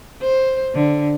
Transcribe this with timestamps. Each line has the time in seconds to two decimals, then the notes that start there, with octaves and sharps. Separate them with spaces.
0.22 C5
0.75 D3